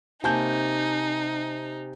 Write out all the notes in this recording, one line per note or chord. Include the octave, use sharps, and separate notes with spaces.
C3 A#3 D#4 G#5 A5 C#6 G6